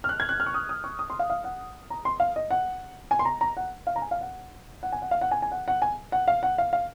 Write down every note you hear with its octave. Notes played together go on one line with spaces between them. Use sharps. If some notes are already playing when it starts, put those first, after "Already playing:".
F6
F#6
G#6
F#6
F6
C#6
D#6
D#6
C#6
D#6
C6
F5
F5
F#5
A#5
C6
F5
D#5
F#5
G#5
C6
A#5
A#5
F#5
F5
A#5
G#5
F5
F#5
F#5
G#5
F#5
F5
F#5
G#5
G#5
F#5
F#5
G#5
F#5
F5
F#5
F5
F5